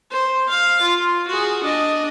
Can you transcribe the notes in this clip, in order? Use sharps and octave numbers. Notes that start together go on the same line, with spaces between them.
C5
F5
F4
F#4 G#4
D4 D#5